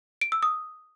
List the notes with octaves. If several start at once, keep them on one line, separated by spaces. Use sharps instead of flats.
D7
E6
D#6